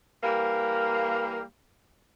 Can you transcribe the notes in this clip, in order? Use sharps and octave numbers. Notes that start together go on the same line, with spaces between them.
E3 G3 A#3